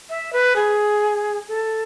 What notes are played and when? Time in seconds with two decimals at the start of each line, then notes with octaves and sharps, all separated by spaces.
0.09 E5
0.33 B4
0.56 G#4
1.48 A4